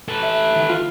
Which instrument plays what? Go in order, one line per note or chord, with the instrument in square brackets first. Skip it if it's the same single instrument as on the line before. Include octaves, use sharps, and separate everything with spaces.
[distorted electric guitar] A4 B4
[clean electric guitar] E5
D#3 E3
[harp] F4